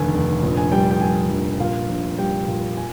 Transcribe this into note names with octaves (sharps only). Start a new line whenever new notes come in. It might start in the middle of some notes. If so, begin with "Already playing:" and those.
Already playing: F1 D#2 D3 G#5
F1
A#1
G#5
G3 G5
G5
G3 G#5
A#1
A#2 F5
A#1
G3 G5
A#2
G#5